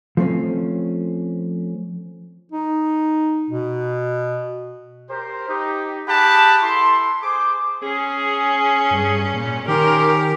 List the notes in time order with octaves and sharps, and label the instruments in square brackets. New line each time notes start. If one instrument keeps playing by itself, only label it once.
[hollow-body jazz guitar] F3 A3 C4 C#4
[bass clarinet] D#4
B2
[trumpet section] G4 A#4 C5
D#4 G4
G4 G#4 F#5 A5 B5
E4 A4 C6
G#4 C5 D6
[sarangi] C#4 [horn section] G#4
[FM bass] G2
A#2
[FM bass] D#3 [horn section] C#4 C5 G5 [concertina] G4 [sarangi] A#4